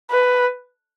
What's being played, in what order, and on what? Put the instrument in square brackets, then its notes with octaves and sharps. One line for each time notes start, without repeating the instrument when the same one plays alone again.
[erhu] B4